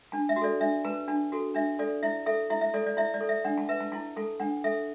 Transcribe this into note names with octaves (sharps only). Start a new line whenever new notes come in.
D4 A5
E5
F#4
A4 D5
D4 E5
B4 A5
D4 A5
F#4 A4
D4 E5
A4 D5
E4 E5
A4 E5
E4 E5
E5
A4 D5
D5
E4 E5
D5
A4
E5
D4 F#5
A5
B4 E5
A5
E4 A5
A4 A5
D4 F#5
A4 E5